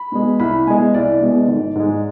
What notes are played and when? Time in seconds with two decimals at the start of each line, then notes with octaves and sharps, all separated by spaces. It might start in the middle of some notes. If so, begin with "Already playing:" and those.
Already playing: B5
0.12 B2 G#3
0.39 C2 B5
0.67 B2 G#3 G#5
0.94 C2 D5
1.21 B2 G#3
1.48 G#1
1.75 G#2 G#3